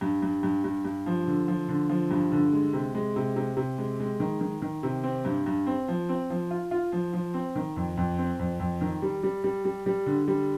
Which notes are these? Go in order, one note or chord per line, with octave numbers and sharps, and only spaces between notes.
G2
G2
G2
G2
G2
F3
D3
F3
D3
F3
G2
D3
G#3
C3
G#3
C3
C3
C3
G#3
G#3
D#3
D#3
D#3
C3
C4
G2
G2
C4
F3
C4
F3
F4
F4
F3
F3
C4
D#3
F2
F2
C4
F2
F2
D#3
G3
G3
G3
G3
G3
D3
G3